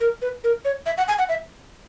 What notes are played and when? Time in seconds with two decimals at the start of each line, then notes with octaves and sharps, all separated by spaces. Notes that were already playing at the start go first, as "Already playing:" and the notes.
0.01 A#4
0.22 B4
0.44 A#4
0.65 C#5
0.86 E5
0.98 F#5
1.08 G#5
1.19 F#5
1.29 E5